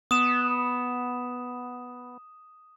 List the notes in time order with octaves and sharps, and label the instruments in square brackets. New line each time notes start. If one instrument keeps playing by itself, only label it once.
[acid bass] B3 [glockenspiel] D#6 E7